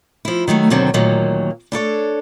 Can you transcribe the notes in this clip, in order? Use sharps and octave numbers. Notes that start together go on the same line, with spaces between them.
F3 E4
D#3 F#3 G3 A3
D#2 B2 D3 D#3 F#3 C4
D2 A#2 D#3 F#3 A#3
D4 E4 A4 C#5